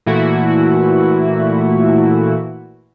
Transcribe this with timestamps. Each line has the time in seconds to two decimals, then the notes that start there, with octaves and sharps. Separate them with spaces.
0.06 A#2 E3 A3 E4 F#4